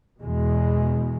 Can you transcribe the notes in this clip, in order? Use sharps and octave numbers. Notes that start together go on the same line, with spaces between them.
E2 B2 G#3